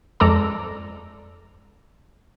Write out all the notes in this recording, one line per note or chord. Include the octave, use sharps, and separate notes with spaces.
F2 G#3 A4 D5 A#5